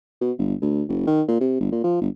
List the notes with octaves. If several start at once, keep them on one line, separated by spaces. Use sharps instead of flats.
B2
G1
D2
F#1
D#3
A#2
C3
G1
A#2
F3
G1